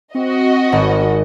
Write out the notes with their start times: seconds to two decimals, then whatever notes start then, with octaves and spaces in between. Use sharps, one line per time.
0.15 C4 F#4 D#5
0.72 G#1